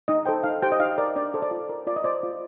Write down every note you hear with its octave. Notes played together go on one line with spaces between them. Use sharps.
D#4 D#5
A4 C5 G5
D#4 F5
G4 C5 G5
D#5
D#4 F5
A#4 D5
D4 D5
A4 C5
D5
F4
A#4
F4 D5
D#5
C5 D5
F4